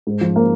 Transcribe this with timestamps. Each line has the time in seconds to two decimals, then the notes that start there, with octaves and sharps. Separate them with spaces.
0.07 G#2
0.21 F3
0.36 A#3